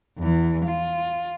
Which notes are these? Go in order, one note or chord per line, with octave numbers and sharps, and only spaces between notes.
E2 E3
F4